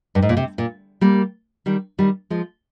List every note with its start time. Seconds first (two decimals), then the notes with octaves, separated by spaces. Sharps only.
0.15 G2
0.22 G#2
0.29 A#2
0.37 C3
0.58 A#2
1.01 G3 A#3
1.66 D#3 G3
1.98 D#3 G3
2.30 F3 G#3